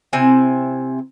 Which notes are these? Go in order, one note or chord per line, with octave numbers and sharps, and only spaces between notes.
C3 C4 E4 G#5